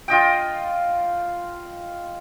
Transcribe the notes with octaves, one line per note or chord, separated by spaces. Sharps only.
F4 D#5 G5